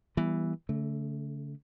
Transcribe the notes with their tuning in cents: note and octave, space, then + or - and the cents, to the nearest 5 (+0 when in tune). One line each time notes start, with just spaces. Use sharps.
E3 +0 G3 -10 B3 -25
D3 -45 A3 +0